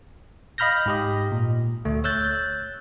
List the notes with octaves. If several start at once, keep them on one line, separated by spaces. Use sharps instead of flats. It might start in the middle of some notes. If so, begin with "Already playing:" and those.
D#5 F5 B5 F6 G6 A#6
G#2 G4 D#5
A#2
D2 A3
C#5 E6 F#6 G6 A6